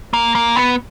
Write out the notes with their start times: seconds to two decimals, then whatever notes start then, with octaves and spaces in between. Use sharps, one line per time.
0.13 A#3
0.35 A#3
0.56 B3